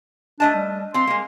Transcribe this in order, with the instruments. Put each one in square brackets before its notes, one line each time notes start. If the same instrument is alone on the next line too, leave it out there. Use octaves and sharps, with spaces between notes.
[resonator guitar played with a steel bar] A3 D#5 A5 [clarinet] D4
[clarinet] G3
[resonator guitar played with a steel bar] C4 F4 [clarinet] C6
[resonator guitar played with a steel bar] G#3 A#3